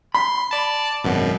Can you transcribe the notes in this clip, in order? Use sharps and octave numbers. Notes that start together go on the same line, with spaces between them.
B5 C6
D5 A5
G#1 F#2 B2